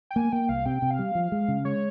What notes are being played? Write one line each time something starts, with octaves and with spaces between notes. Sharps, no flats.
G5
A#3 G#5
A#3 G5
C2 F5
C3 G5
C3
F5
G3
F3
G#3
C#3
G#3 C#5